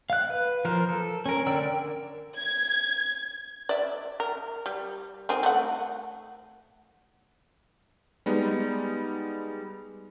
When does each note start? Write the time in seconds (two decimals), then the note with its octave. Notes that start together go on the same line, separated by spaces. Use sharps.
0.10 F5 F#6
0.30 B4
0.65 F3 A#4 C5
0.89 A4
1.26 C#4 A#4
1.46 D3 A#4 D5 G5 E6
2.37 G#6
3.69 D5 E5
4.20 A#4
4.66 G3
5.29 D#3 C4 G#5
5.43 A3 A#4 F#5
8.26 G3 G#3 B3 D#4